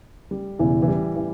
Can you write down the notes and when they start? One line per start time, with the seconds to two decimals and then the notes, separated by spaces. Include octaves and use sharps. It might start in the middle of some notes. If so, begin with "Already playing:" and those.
0.31 G3
0.59 E1 E2 C#3 E3
0.82 E3
0.88 G3
1.16 E3